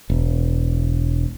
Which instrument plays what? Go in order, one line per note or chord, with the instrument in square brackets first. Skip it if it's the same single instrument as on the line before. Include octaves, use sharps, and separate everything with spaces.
[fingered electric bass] E1